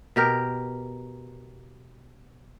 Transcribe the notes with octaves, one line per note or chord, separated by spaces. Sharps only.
B2 G4 A#4